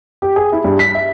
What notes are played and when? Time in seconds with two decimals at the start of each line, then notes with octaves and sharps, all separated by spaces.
0.22 G4
0.36 G#4
0.52 E4
0.64 G2
0.79 B6
0.95 E5